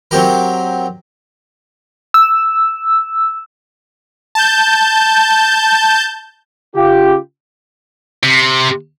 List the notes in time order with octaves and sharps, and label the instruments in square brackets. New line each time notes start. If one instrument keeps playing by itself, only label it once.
[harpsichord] F#3 C4 G4 A#4
[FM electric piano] E6
[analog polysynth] A5 G6
[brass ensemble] C#3 F4 G4
[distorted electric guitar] C3